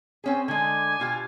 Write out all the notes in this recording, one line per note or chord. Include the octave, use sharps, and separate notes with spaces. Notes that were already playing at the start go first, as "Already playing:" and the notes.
C4 C#4 G#4
D3 G#3 G#5
B2 F4 G4